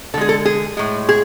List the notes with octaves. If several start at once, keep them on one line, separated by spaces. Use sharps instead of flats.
D3 G#3 G#4 A4
A4
G#4
A2 G#3
G#4